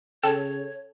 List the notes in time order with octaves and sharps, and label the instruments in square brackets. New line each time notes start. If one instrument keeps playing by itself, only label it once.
[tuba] C#3 [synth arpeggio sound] A4 [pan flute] C#5 [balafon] G5